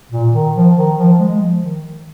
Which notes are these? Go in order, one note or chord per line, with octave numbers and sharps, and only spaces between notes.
A#2
D#3
F3
D#3
F3
G#3
G#3
F3
D#3